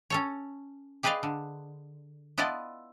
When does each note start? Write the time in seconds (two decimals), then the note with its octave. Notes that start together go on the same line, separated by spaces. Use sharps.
0.10 C#4 A4 C#5
1.03 G4 G#4 B4 D5 D#5 F5
1.23 D3
2.38 B3 E4 F4 D5 D#5 A5